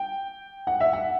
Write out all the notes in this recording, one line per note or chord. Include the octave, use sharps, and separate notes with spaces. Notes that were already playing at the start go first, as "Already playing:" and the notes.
Already playing: G5
F#5
E5
F#5